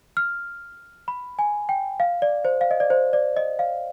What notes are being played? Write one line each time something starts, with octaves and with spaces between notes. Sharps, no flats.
F6
B5
G#5
G5
F5
D5
C5
F5
D#5
D5
C5
D5
D#5
F5